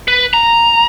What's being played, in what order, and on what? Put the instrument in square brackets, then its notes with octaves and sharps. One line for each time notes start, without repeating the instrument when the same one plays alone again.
[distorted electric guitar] B4
A#5